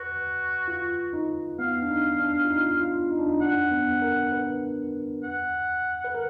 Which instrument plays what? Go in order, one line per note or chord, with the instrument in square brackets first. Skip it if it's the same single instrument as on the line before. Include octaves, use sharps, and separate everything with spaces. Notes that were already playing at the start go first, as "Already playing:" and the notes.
Already playing: [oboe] F#4 [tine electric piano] B4
[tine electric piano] F4
D#4
[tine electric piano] B3 [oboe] F5
[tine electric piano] D4
D#4
D4
F4
D#4
F4
D#4
D4
D#4
[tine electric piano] D4 [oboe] F#5
[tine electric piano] B3
A#4
B4
[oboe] F#5
[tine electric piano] B4
A#4